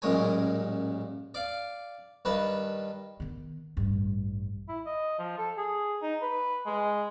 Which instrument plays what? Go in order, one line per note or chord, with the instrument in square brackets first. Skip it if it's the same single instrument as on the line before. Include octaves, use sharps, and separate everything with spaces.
[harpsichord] A1 F#2 A#2 G#3 C#5 G#5
D5 F5
G2 D#3 B4 A5
[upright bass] D#3 B3
A1 G2
[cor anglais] E4
D#5
F3
A4
G#4
D#4
B4
G#3